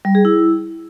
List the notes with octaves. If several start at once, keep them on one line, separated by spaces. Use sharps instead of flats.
G3
G#4
E4